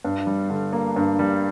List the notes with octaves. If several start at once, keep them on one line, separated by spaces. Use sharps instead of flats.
G2
G3
D3
A#3
G2
G3